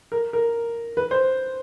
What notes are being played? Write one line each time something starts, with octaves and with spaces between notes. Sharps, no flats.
A#4
A#4
B4
C5